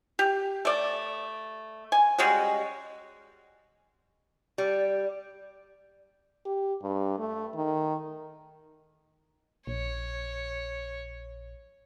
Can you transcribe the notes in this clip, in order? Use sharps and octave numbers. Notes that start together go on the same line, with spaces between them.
G4
A3 D5
G#5
G3 G#3 C#4 F#4
G3
G4
G2
A3
D#3
A#1 C#5